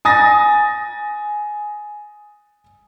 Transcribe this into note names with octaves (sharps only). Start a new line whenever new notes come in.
G#5 D#6 A6 A#6